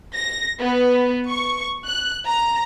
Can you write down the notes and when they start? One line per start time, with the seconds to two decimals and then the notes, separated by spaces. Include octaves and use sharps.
0.14 A#6
0.60 B3
1.28 C#6
1.86 F#6
2.26 A#5